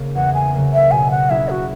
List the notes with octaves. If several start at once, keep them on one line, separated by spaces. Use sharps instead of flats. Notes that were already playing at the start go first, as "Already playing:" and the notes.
Already playing: C#3 A#3
E2 F#5
G#5
C#3 F#3 A#3
E5
B2 G#5
F#5
F#3 C#4 E4 G#4 E5
F#4